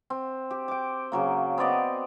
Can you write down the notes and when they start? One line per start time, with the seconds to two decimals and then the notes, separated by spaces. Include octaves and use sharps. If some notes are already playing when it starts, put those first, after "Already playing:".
0.10 C4
0.51 G4
0.68 G5 D6
1.12 C#3 F#3 A#3
1.58 B3 C4 D5 D#5